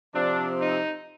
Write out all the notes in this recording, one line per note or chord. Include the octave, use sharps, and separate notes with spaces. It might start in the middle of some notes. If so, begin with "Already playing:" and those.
C3 F3 C4 D4
D#4